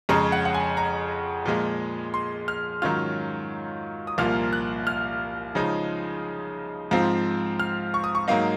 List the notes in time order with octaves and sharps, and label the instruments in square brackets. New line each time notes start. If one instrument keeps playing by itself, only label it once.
[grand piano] F2 C#3 G#3 C#4 A#5
F#5
F#5
G#5
A#5
A#2 F3 G#3
C6
F6
G#2 D#3 F#3 C#4 F4 F6
D#6
C2 A#2 F3 A#3 F4 F6
F#6
F6
C#3 F3 G#3 D#4
G#2 F3 C4 F4
F6
C#6
D#6
C#6
G#2 F#3 A#3 D#4 F5